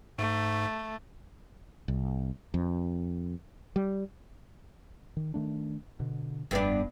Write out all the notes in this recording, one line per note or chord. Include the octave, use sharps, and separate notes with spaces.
G#2 A3
C2
F2
G3
D#3
D#3 A3 D4
B2 D3
F1 G2 B3 D4